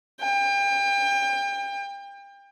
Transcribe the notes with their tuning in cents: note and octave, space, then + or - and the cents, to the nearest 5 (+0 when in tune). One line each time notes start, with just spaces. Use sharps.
G5 +30